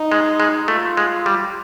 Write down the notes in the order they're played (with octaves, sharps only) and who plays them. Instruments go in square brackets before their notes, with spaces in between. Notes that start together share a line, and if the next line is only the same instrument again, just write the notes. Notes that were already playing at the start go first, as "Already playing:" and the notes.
Already playing: [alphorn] D#4
[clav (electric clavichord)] G#3
G#3
[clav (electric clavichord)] A3 [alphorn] F4
[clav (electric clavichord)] G#3
G3